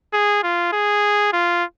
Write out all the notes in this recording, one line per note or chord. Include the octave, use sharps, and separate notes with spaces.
G#4
F4
G#4
F4